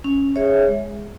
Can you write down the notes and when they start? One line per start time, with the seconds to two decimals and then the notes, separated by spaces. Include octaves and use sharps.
0.04 C#4
0.36 G#4 C#5 E5
0.68 G#3